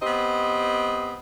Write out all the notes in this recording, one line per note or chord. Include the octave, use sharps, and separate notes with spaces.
B3 C4 G4 D#5